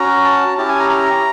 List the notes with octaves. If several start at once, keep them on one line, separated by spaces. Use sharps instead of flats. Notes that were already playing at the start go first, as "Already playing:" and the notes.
Already playing: C#4 F#4 A#5
A5
C#4 E4 G4 A5
G#5
A#5
A#5